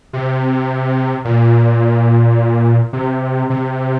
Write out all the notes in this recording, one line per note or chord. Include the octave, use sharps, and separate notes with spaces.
C3
A#2
C3
C3